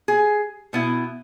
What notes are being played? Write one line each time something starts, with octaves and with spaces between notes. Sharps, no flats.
G#4
B2 B3 E4